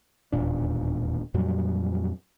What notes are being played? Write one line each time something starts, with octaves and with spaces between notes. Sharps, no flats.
E1 D#2 A#2 D4
F2 A#2 F#3 G3